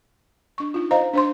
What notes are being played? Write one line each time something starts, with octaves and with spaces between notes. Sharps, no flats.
D4 C#6
D#4 F4
C5 D#5 F5 A#5
D4 C5 C6